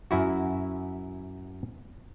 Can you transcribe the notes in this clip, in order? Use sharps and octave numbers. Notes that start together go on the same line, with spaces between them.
F#2 E4 F#4